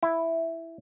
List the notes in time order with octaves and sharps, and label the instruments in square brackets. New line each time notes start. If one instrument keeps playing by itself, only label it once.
[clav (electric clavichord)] E4